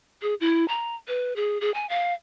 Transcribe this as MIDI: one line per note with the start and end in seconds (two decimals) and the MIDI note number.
0.22 0.35 68
0.41 0.68 64
0.68 0.95 82
1.08 1.36 71
1.36 1.58 68
1.61 1.73 68
1.74 1.88 80
1.89 2.13 77